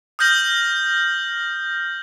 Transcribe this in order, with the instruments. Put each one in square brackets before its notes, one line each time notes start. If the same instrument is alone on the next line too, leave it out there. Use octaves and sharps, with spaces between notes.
[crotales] D#6 F6 G6 A#6 F#7